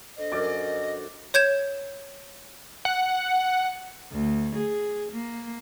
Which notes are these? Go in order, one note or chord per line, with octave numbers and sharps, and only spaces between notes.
D4 A4 C5 D#5
F#2 D5
C#5 G6 G#6 E7
F#5
D2
G#4
A#3